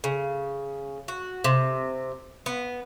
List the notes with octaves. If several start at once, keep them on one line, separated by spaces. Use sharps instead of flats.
C#3
F#4
C3
B3